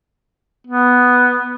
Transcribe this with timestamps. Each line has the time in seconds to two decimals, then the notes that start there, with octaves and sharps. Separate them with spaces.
0.67 B3